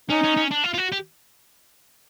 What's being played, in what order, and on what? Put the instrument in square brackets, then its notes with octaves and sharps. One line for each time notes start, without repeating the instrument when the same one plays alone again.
[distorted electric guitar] C#4 [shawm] D#4
[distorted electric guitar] C#4
C#4
D4
F4
F4
F#4
G4